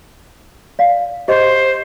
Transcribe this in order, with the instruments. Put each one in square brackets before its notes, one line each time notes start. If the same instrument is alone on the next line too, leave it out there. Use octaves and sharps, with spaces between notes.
[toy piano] D5 F5
[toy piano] G4 D#5 [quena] C5